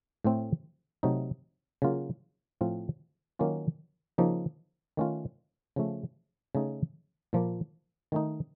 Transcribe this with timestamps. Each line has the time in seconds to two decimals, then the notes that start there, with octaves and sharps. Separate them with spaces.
0.24 A2 A3 C4
1.03 C3 F#3 A3 D#4
1.82 C#3 F#3 A#3 F4
2.61 A2 F3 C4 F4
3.39 D#3 F#3 A#3 C#4 F4
4.18 C#3 F3 A#3 D#4
4.97 D#3 A3 C#4 F4
5.76 C#3 F3 A3
6.55 C#3 A3 D#4
7.33 A#2 F3 A#3
8.12 D#3 A3 D#4